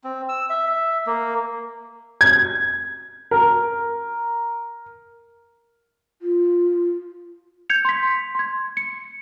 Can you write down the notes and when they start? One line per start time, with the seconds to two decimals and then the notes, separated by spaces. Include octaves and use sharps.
0.04 C4
0.29 E6
0.50 E5
0.67 E5
1.07 A#3
2.21 G#6
3.31 A#4
6.22 F4
7.70 G6 G#6 C#7 F7
7.85 C6 B6
8.35 C6 G#6
8.77 C#7